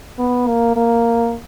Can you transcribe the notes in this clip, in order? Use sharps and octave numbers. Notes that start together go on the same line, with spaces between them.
B3
A#3
A#3